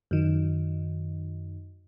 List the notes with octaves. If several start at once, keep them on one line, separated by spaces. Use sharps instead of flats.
F#2 D#3